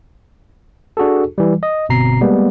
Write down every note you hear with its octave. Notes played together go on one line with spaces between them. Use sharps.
D4 F#4 G#4 A4
E3 G3
D#5
G1 B2 C4 A#5 C7
G3 G#3 A#3 B3